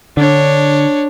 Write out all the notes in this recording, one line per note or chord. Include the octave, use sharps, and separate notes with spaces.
D3 D4 C#5